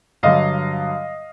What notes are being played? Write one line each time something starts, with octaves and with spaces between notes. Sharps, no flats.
G2 D3 F#3 D#5 F5